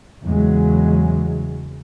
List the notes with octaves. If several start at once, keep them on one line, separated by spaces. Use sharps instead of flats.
E2 C#3 F#3 G#3